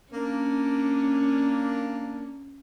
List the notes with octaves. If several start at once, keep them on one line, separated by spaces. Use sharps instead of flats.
A#3 C#4 D4